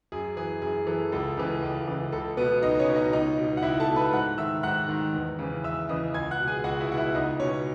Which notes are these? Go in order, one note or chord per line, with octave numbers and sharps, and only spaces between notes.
F#2 G#4
E3 G#4
F#2 G#4
E3 A4
C#2 A4
C#3 E3
C#2
C#3 E3
C#2 A4
B2 B3 B4
C#2 D#4 D#5
C#4 C#5
B2
D#4 D#5
C#2 D#4 D#5
B2
F#5
C#2 E4 E5
A4 A5
B2
B4 B5
G#2 F#5 F#6
D#3 E5 E6
G#2 F#5 F#6
D#3
E2
C#3 E3
E2 E5 E6
C#3 E3 D#5 D#6
C#2 G#5 G#6
F#5 F#6
B2
G#4 G#5
C#2 F#4 F#5
E4 E5
B2 F#5
E4 E5
C#2 D#4 D#5
B2 C#4 C#5